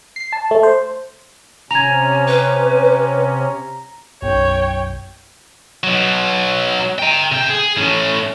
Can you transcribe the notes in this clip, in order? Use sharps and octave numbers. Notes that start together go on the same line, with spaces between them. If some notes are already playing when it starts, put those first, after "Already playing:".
C7
A5
A3
C5
C3 C#4 G#5 A#5 G#6 F7
B4
B1 F#2 C#5 G5
B2 F#3
G5 A#5
C3 G5
G#4
A2 C#4